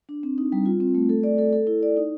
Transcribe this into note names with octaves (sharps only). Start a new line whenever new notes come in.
D4
C4
D#4
G3
F4
C4
A3
A4
D5
A4
A4
E4
D5
D#4